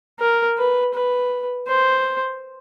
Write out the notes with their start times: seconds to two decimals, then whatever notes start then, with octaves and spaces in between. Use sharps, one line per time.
0.19 A#4
0.58 B4
0.94 B4
1.68 C5